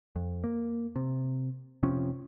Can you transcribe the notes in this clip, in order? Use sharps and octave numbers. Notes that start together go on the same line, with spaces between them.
F2
A#3
C3
F1 C3 F3 C#4